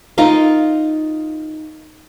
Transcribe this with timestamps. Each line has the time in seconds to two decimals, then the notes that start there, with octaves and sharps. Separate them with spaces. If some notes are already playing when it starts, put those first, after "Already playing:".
0.18 D#4 F4 A#4 F5